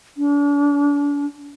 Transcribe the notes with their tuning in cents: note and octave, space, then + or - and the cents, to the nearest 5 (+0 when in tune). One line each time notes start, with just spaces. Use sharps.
D4 -40